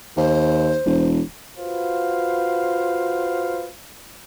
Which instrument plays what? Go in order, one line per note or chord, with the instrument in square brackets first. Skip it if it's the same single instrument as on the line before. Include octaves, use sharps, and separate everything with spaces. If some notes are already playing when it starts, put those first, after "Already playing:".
[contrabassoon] D#2 [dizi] C5
[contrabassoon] E1
[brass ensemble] F4 F#4 B4 C5 F5